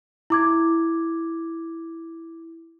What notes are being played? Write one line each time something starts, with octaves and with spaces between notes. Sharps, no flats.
E4 D6 G#6